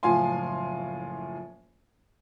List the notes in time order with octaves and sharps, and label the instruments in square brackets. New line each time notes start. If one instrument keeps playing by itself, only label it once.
[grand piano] F#1 A2 F3 F4 G#5 C6